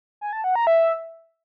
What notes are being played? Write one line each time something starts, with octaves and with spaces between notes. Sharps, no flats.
G#5
A5
F#5
A#5
E5